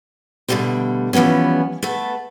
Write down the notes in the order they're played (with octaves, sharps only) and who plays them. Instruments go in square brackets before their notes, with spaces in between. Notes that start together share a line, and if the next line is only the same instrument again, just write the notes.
[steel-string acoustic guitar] B2 D3 F3 G3 A3 C4
E3 F3 G3 B3 C#4
A3 B3 A4